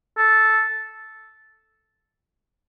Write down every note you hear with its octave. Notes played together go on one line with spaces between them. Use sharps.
A4